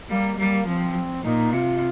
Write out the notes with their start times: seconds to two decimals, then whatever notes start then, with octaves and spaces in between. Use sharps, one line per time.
0.10 G3 A#3
0.38 G3 A#3
0.67 F3 C4
1.24 A#2 D#4
1.53 C3 F4